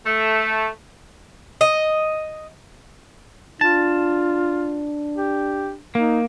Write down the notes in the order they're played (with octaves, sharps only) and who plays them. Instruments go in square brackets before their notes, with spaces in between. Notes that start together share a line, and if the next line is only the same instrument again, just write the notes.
[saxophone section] A3
[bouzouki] D#5
[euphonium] D4 [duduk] F4 [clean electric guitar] A5
[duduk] G4
[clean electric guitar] A#3 [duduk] D#4